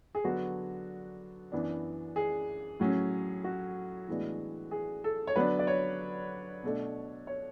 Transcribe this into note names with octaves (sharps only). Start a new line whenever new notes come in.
G#4
D3 F#3 B3 D4 F#4
F#2 E3 B3 D4
G#4
A2 F#3 C#4
F#4
A2 E3 G#3 B3 D4
G#4
A4
C#5
D3 F#3 B3 D4 B4
D5
C#5
B2 A3 D4
C#5